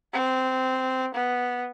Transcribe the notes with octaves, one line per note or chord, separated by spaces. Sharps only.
C4
B3